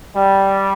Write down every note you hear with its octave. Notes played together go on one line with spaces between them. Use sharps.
G3